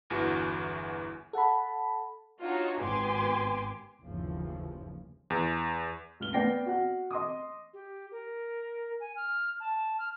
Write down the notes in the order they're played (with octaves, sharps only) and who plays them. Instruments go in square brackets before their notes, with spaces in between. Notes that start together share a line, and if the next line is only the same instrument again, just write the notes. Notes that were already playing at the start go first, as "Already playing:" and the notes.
[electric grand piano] G1 E2 E3 F#4
[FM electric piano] A4 F#5 A5 B5
[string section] D4 D#4 F4 F#4 C#5
G#1 B3 G4 G#5 C6 D6
[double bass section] G1 D#2 C#3 E3 F3
[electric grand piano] E2
[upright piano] C#2 F6 G7
B3 D5 G5 A#6 C7
F#4 F#5
D#5 C6 D6 D#6
[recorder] G4
A#4
G#5
F6
A5
F6